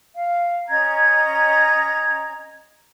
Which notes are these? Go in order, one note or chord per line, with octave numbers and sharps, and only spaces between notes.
F5
C#4 D#5 A#5 G#6